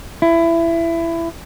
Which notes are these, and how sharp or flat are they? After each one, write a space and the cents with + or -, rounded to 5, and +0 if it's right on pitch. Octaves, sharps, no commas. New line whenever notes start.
E4 +20